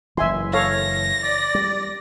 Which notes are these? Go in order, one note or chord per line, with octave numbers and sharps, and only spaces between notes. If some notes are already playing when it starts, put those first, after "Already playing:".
F#1 E3 E5 G#5 C6
A4 C#5 F5 A#6
D5
G3